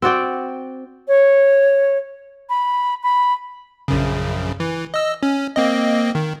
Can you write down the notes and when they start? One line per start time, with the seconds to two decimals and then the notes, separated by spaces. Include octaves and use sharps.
0.02 C4 F#4 D5 G5
1.08 C#5
2.49 B5
3.03 B5
3.88 A#1 F#2 C#3
4.60 E3
4.94 D#5 E6
5.23 C#4
5.56 A#3 C4 D#5
6.15 D#3